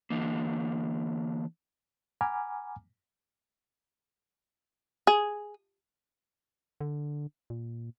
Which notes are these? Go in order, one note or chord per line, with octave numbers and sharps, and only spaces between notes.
D3 E3 A#3
F#5 G#5 A#5 B5 D6 F6
G#4
D3
A#2